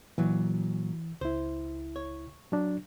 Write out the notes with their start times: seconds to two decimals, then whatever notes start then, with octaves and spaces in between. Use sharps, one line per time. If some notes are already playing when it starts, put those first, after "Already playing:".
0.18 A#2 E3 F#3
1.21 C#2 E4 C5
1.96 C#5
2.52 F#3 D4